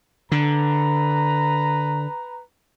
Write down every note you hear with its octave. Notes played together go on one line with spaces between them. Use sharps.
D3 B4 A#5